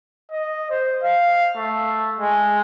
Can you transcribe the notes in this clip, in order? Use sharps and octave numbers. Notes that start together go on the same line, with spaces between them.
D#5
C5
F5
A3
G#3